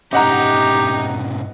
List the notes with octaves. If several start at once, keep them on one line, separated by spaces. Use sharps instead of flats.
G#2 B2 C#4 D#4 G4 D#5 F#5 A#5